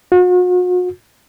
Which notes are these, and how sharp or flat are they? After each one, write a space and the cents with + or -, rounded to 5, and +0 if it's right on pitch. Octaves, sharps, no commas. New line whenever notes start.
F#4 -40